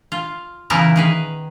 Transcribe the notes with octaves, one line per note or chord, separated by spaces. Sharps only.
F4
A#2 C#3 E3 B3 E4 A#4
D#3 G#4 B4